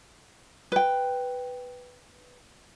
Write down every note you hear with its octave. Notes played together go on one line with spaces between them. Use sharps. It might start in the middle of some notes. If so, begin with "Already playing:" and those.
B4 G5